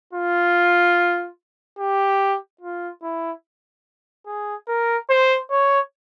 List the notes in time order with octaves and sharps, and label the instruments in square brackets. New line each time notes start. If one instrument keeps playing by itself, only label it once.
[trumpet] F4
G4
F4
E4
G#4
A#4
C5
C#5